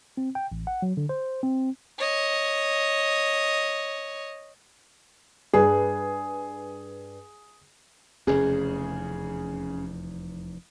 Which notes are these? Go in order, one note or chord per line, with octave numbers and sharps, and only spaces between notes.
C4
G5
A1
F#5
F#3
D3
C5
C4
C#5 D#5
G2 G#4 B4
F1 E2 C#3 G#4